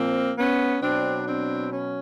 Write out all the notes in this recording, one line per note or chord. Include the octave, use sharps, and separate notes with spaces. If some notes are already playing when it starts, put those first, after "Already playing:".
Already playing: A#2 F3 A#3 C4
B3 C#4
B2 F#3 C4 D4
C4 D4
C#4